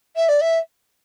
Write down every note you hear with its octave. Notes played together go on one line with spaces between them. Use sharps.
E5
D5
E5